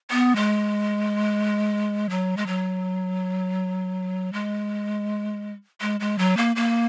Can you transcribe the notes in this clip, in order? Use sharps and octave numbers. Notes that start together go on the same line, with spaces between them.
B3
G#3
F#3
G#3
F#3
G#3
G#3
G#3
F#3
A#3
A#3